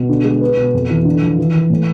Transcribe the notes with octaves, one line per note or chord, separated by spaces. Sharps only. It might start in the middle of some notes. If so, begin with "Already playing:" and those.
Already playing: B2
D3
G#3
B4
B2
F2
E3
D3
F3
E3
E3
A2